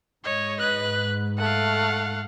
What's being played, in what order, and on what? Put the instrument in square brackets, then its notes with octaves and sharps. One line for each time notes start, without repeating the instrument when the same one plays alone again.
[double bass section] G#2 [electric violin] C#5 [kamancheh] D#5
[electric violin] B4 F#6
[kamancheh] A3 [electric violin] F5 F#5